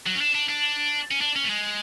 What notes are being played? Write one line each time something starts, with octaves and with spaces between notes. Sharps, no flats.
F#3
C#4
D4
D4
D4
C#4
D4
C#4
A3
G#3